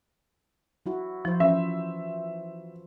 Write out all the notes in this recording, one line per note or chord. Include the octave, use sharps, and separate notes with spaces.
F#3 E4 F#4
F3 E4 C5
E3 F3 C#4 E5